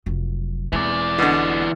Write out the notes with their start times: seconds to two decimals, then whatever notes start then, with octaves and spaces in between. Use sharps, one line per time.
0.06 F1 F#3
0.73 E1 E3 G#3 D5
1.18 B2 D3